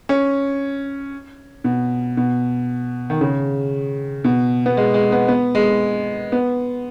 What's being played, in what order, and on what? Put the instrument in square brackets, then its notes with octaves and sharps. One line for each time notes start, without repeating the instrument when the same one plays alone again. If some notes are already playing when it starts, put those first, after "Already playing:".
[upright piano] C#4
B2
B2
D#3
C#3
B2
B3
G#3
G#3
B3
B3
G#3
B3